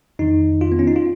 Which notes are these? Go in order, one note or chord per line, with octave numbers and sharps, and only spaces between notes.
F2 D#3 D#4
F4
B3
C#4
D#4
F4